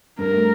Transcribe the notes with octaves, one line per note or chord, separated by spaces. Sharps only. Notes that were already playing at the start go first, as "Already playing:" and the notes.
G2 A#4
A3